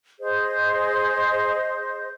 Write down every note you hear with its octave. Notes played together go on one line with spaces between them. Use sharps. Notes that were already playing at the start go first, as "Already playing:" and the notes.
G#4 C5 D#5